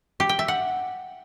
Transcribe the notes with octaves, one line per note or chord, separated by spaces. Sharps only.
G4
G5
E5
F#5